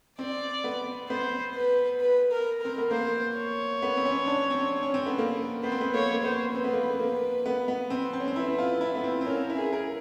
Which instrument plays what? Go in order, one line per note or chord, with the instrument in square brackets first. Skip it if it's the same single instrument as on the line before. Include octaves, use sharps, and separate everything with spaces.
[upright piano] C4 [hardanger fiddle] D5
[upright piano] B3
[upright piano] B3 [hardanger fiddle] C5
[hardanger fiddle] B4
B4
A#4
[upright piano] C4 [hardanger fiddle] A#4
[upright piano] B3
[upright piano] A#3 [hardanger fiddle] C5
[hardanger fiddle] C#5
[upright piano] B3
C4
C#4
D4
C4
C#4
C4
B3
A#3
[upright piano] B3 [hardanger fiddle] C5
[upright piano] C4
B3
[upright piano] A#3 [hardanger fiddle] C#5
[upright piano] A#3
[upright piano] B3 [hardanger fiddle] C5
[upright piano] C4 [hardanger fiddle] B4
[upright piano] B3
A#3
B3
A#3
B3
B3
C4
C4
C#4
C4
[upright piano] E4 [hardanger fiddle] B4
[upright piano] F4
E4
B3
C4
C4
[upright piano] C#4 [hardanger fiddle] A#4
[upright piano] E4
[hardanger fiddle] G#4
[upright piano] A#4